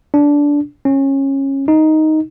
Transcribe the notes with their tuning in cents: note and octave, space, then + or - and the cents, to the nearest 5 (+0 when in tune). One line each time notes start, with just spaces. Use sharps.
D4 -15
C#4 -20
D#4 +5